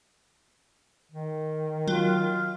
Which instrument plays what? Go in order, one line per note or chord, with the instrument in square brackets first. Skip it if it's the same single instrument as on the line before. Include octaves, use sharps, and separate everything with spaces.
[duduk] D#3
[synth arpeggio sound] F#3 [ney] F4